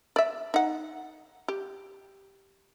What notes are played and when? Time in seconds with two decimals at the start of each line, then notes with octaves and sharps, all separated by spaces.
0.16 D5 E5
0.54 D#4 F#5
1.48 G4